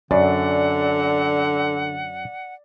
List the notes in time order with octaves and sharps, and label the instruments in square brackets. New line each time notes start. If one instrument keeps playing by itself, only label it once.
[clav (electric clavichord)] F#2 [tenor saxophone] D3 [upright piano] D5 [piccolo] F#5